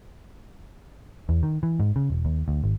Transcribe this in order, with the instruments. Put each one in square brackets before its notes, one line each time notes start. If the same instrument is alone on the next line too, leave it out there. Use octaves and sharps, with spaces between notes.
[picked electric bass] E2
D#3
E3
G#2
C#3
E1
D#2
D2
G#1